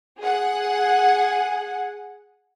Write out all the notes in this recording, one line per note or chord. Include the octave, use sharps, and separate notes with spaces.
G#4 F#5